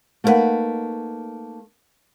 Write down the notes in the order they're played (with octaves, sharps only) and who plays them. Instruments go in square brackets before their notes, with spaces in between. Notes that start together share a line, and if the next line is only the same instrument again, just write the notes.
[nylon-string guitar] A3 A#3 D#4 F#4 B4 F#5